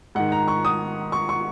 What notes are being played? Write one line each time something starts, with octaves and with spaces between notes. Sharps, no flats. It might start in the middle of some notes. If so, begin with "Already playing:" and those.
G#2 D#3 F#5
A#5
C#6
D#6
C#6
C#6